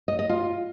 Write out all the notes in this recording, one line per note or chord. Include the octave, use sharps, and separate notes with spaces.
D#5
D#5
F4